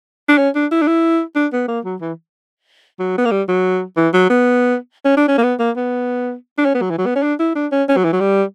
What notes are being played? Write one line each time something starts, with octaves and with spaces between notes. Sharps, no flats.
D4
C#4
D4
E4
D4
E4
D4
B3
A#3
F#3
E3
F#3
B3
A#3
G3
F#3
E3
F#3
B3
C#4
D4
C#4
A#3
B3
A#3
B3
D4
C#4
B3
F#3
E3
F#3
B3
C#4
D4
E4
D4
C#4
C#4
F#3
E3
F#3
G3